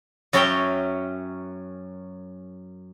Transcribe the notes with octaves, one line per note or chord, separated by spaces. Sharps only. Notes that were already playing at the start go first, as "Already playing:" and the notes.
F#2 F#3 C#4 C#5 E5 G5